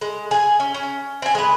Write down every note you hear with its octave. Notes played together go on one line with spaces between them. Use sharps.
G#3
G#4 G#5
C#4
C#4
C4 G#5
G#3 B4